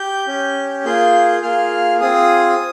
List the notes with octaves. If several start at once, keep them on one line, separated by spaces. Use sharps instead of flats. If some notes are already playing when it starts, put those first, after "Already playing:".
Already playing: G4 G6
C#4 G4
A#3 F4 G#4 G6
A#3 F4 G#4 F6
C4 F4 G#4 D#6